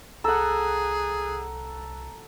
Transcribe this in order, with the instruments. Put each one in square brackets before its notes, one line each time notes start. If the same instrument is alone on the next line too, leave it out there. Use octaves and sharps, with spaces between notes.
[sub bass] C2 [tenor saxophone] G#4 [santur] A4 F#5 [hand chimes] A#5